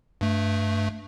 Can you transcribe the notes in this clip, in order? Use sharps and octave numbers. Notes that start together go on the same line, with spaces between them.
G2 A3